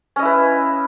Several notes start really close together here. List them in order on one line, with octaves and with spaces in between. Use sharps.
C#4 D#5 E4 B4